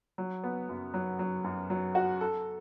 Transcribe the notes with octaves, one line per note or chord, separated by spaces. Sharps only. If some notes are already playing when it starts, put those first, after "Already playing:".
F#3
B3
F#2
F#3
F#3
F#2
F#3
F#4
A4